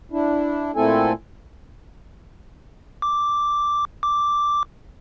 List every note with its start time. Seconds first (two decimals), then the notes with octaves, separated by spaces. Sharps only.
0.12 D4 E4
0.76 A#2 A3 C4 E4 A4 G#5
3.02 D6
4.03 D6